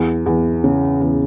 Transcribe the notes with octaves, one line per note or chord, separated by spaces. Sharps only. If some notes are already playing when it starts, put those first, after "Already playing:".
Already playing: E2
E2
C#3
E2